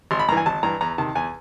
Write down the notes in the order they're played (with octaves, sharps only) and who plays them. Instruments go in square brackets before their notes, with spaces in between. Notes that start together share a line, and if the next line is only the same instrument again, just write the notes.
[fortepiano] G#1 C6
B5
G2 A#5
E3 G#5
G#1 A5
G2 E3 A#5
E2 A#5
C3 D#3 A5
E2 G#5